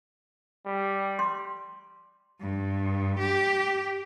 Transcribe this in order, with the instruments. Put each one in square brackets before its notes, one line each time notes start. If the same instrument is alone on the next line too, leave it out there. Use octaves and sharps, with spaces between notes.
[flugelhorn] G3
[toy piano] C6
[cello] G2
G4